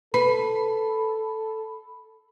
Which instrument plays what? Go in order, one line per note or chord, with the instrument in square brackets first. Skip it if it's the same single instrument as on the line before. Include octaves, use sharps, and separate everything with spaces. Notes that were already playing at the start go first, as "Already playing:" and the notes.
[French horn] A4 [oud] B4 [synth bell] B5